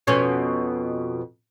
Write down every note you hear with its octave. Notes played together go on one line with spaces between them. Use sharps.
F2 B2 C#4